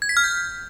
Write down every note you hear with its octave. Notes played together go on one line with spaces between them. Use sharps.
G#6
B6
F6
G6